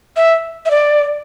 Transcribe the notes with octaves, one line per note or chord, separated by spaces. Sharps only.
E5
E5
D5